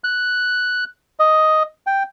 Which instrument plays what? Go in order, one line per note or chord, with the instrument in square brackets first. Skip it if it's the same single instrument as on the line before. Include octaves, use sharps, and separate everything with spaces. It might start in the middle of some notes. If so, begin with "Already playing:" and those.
[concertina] F#6
D#5
G5